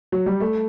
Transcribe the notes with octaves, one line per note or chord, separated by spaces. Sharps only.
F#3
G3
A3